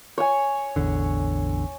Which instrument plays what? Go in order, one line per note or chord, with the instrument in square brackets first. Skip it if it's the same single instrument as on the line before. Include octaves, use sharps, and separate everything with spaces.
[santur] C#5 G#5
[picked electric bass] A1 E2 D3